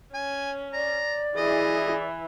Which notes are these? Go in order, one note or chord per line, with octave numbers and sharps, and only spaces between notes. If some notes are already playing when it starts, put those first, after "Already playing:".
C#4 G#5
D5 A#5
E3 E4 G#4 D#5